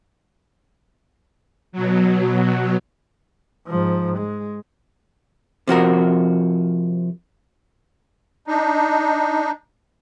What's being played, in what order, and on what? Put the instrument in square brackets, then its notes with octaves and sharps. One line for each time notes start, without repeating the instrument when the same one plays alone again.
[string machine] B2 F#3
[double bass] G#2 F3
G#3
[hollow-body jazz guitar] C3 F3 F#4 A#4
[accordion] D4 D#4